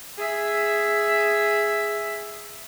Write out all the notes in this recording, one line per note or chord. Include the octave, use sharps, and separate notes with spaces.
G#4 E5